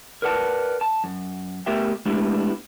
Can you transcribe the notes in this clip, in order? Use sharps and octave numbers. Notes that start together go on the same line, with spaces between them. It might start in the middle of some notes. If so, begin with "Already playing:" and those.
A#4 B4 D5 F#5 G5 A5
A5
F#2
A3 B3 G4 A#4 E5 G5
G#3 A3 B3 D4 E4 G4